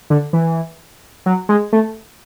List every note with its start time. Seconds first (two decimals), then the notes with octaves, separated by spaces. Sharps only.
0.10 D3
0.33 E3
1.26 F#3
1.49 G#3
1.73 A3